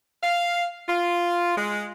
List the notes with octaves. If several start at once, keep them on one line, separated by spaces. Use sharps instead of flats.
F5
F4
G#3